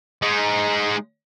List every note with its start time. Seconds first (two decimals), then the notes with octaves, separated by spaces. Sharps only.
0.22 G#3 D#4